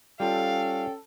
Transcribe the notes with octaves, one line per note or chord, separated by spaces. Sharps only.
G3 C#4 F4 A4 F5 G5